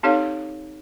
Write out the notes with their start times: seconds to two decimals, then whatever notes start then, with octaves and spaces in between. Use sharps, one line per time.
0.03 C4 D#4 G4 A4 C#5 F5